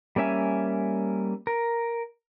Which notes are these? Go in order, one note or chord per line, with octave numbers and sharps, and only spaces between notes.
G3 A#3 C#4 E5 G#5
A#4